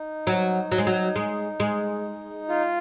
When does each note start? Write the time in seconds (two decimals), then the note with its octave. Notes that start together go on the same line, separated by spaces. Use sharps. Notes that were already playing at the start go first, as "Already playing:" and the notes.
Already playing: D#4
0.27 F#3
0.72 F#3
0.78 G#3
0.87 F#3
1.16 G#3
1.60 G#3
2.49 F4